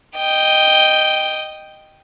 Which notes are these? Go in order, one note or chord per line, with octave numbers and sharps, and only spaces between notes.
D#5 G5